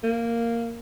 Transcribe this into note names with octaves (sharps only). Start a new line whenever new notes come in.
A#3